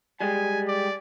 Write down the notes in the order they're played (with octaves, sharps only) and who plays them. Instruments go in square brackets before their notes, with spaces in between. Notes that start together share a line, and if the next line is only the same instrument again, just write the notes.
[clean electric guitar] G3 G#3 [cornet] G#5
[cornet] D5